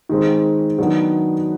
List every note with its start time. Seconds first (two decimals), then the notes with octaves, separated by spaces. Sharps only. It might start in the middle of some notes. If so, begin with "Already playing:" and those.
0.09 D#3 G#3 C4
0.79 D#3 F#3 B3 D4 F#4